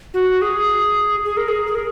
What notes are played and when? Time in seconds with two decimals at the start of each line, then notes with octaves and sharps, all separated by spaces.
0.14 F#4
0.42 G#4
1.25 G#4
1.37 A#4
1.48 G#4
1.67 G#4
1.75 A#4